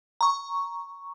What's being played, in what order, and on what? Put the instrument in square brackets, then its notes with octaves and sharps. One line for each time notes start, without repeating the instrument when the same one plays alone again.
[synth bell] A#5 C#6